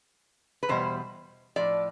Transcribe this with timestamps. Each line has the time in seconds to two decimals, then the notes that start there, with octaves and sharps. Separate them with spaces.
0.63 B4
0.69 E2 B2 G3 C5
1.56 A2 F3 D5